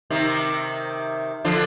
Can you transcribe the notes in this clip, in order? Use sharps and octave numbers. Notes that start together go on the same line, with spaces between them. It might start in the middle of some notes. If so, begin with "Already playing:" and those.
C3 D#3
D3 F3